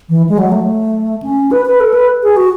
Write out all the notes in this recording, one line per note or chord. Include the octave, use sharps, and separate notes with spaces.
E3
G#3
F#3
A3
C#4
B4
B4
A4
B4
G#4
F#4